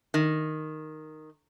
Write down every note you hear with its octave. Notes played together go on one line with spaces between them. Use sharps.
D#3